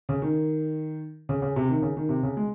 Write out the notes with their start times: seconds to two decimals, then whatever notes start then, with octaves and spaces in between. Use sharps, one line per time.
0.09 C#3
0.22 D#3
1.29 C#3
1.42 C#3
1.56 C3
1.69 D#3
1.82 C#3
1.97 D#3
2.09 C3
2.23 C#3
2.37 G#3